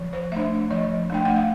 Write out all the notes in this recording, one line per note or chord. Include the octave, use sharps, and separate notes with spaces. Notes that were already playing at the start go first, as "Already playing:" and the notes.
Already playing: F3
C5
A3 D4 E5
F3 D#5
A3 D4 G5
F#5
F5